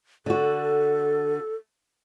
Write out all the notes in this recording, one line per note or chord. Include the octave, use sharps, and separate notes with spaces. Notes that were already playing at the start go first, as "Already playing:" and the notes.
D3 F#4 A4